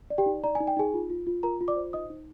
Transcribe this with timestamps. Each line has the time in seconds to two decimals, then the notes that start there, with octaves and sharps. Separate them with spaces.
0.10 D5
0.18 G4 G5
0.26 D#4
0.44 D5 A#5
0.55 G#5
0.60 D#4
0.67 G5
0.77 D#4 G#4 G#5
0.94 F4
1.10 F4
1.27 F4
1.43 F4 A#4 A#5
1.61 F4
1.68 D5 D6
1.76 C5
1.93 D#4 D#5 D#6
2.10 D#4